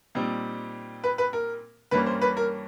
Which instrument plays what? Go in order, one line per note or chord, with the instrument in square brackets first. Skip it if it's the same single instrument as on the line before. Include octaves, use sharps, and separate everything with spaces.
[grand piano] A#2 G3 C4 D#4
B4
B4
A#4
G2 E3 G3 A#3 C#4 B4
C5
B4
A#4